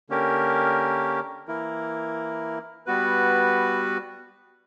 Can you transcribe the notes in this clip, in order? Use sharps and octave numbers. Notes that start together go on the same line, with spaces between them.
D3 A#3 C#4 G4 A#4
E3 A#3 E4 A#4
G3 B3 F#4 B4